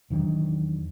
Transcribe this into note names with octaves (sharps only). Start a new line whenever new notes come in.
E2 D#3 F#3 D4